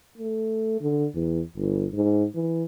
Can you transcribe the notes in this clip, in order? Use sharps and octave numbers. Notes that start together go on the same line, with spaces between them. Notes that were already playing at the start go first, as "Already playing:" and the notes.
A3
D3
E2
G1
G#2
E3